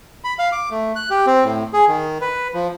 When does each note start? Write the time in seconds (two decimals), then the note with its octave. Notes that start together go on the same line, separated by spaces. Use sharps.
0.24 B5
0.39 F5
0.52 D6
0.71 A3
0.96 F#6
1.10 G4
1.27 C4
1.44 A2
1.73 G#4
1.88 D#3
2.21 B4
2.54 F3